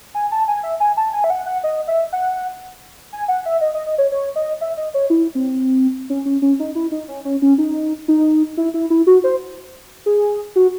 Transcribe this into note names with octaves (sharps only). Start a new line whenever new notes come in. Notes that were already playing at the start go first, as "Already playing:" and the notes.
G#5
A5
G#5
E5
G#5
A5
G#5
E5
F#5
F#5
D#5
E5
F#5
G#5
F#5
E5
D#5
D#5
D#5
C#5
C#5
D#5
E5
D#5
C#5
E4
C4
C#4
C#4
C#4
D#4
E4
D#4
C#4
C#4
C#4
D#4
D#4
E4
E4
E4
F#4
C5
G#4
F#4